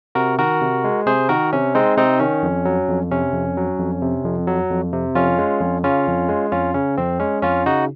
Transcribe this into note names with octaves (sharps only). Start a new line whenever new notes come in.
C3 F#4 A#4
D#3 F#4 A#4
C3
G#3
C3 G#4 C5
D#3 F#4 A#4
C3 C#4
G#3 C4 D#4
C3 C4 D#4
D#3 C#4
F2
F#3
F2
C3 C#4
F2
F#3
F2
C3
F2
F#3
F2
C3
F2 C#4 F4
G#3
F2
C#3 C#4 F4
F2
G#3
F2 C#4 F4
C#3 C#4
F2 C4
G#3 C#4
F2 C#4 F4
C#3 D#4 F#4